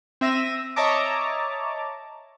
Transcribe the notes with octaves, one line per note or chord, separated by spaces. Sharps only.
C4 E5 A#6 D#7 E7
C#5 D#5 E5 A5 A#5 D6